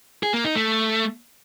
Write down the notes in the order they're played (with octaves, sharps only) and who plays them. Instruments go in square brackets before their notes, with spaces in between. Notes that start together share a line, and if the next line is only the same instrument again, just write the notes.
[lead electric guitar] G#4
A#3
D#4
A3